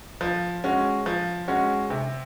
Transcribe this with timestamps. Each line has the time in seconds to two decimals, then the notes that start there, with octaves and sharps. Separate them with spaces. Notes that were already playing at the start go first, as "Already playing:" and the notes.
0.21 F3
0.64 G#3 C#4 F#4
1.06 F3
1.48 G#3 C#4 F#4
1.90 C3